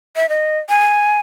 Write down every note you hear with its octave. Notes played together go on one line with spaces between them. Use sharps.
E5
D#5
G#5